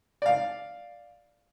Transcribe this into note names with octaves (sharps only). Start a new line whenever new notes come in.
D5 F5